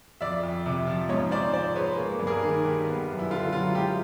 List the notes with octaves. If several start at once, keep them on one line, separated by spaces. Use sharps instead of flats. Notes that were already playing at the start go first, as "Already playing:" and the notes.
F2 D5 E5
F2
C3
F3
G#2 C#5 D#5
G#2 C5 D5
F3 C5 D5
G#3 B4 C#5
A#3
G2
G#4 A#4
D#3
G3
B3
F#2
E4
D3 F4
F#3 F4
G#3 F4 G4